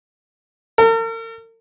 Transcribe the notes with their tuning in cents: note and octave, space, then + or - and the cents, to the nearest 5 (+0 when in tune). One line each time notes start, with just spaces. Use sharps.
A#4 -45